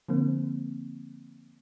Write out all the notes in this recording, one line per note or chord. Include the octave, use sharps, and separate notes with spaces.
D3 F3 A#3 C4